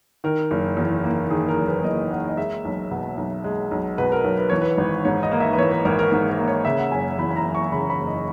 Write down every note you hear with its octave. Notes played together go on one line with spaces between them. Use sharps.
D#3 A#4
F#1
E2
A#3
D#3 G#4
A#4
F#1
B4
E2 D#5
A#3 F#5
D#5
G#3 E5
B1
B2
B1
G#3
B1
B2 B4
A#4
B1
B4
E3 C#5
B4
G#1
G#2 C#5
D#5
A#3
E5
B4
E3 C#5
B4
G#1 A#4
A#4
G#2 A#4
A#4
A#3
C#5
C#3 E5
F#5
F#1 G#5
E2 B5
B5
A#5
F#1
C#6
C#3 B5
B5
F#1
D#5